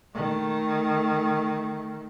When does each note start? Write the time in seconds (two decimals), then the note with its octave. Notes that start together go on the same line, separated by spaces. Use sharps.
0.14 D#3 A3